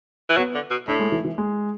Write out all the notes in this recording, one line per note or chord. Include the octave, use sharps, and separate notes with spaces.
E3
F#3 B3
D3
B2
A2 D4
G#3
E3
E3
G#3